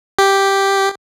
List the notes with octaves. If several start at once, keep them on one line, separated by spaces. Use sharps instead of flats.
G4